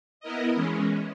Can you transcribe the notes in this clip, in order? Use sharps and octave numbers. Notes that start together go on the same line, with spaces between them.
B3 E4 A#4 D#5
E3 G#3 C#4